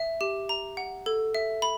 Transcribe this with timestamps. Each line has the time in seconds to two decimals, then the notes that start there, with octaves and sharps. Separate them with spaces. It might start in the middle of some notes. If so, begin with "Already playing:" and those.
Already playing: E5
0.21 G4
0.49 A#5
0.77 F#5
1.06 A4
1.35 E5
1.62 B5